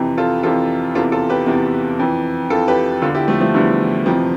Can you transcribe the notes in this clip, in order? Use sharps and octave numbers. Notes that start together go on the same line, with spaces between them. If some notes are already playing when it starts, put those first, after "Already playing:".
Already playing: F2 C3 E3
F4 A4
F2 C3 E3 F4 A4
E2 C3 E3 F4 A4
F4 A4
G4 B4
E2 C3 E3
F2 E3
F2 E3 F4 A4
G4 B4
E2 D3 F4 A4
E4 G4
F3 A3
F3 A3
E2 D3 E3 G3
F2 C3 E3 F3